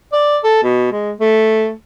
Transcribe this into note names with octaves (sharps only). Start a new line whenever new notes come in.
D5
A4
B2
G#3
A3